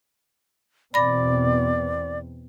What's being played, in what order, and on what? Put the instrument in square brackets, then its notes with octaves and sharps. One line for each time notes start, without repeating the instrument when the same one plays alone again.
[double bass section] E2 B2 C4 [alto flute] D5 [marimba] B5 A#6